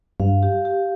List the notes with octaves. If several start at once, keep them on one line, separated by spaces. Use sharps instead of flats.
G2 F5
G4
G4